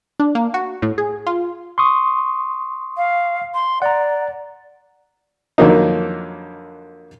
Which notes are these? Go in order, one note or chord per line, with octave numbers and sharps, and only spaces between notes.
D4
A#3
F#4
A2
G#4
F4
C6 C#6 D#6
F5
C6
D5 F#5 A#5
F2 D3 D#3 F#3 A#3 D#4